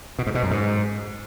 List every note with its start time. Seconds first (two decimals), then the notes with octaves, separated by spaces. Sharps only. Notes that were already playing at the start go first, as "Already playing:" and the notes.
0.19 B2
0.27 G#2
0.35 B2
0.43 F#2
0.51 G#2